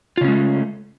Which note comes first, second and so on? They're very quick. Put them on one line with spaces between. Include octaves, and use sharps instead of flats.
F4 C#3 C#4 G#3 A3